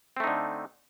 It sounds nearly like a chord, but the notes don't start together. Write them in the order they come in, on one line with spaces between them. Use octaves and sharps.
C4 A3 D#4 D3